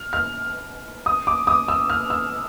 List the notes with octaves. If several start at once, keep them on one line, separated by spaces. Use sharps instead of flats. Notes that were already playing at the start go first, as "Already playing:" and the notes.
Already playing: F6
F6
D#6
D6
D#6
E6
F6
E6